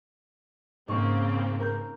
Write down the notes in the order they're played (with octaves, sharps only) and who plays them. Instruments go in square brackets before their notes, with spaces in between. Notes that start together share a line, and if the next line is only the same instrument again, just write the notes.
[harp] G#2 C#6 [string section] C#3 A#3 C4
[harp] A#4 G6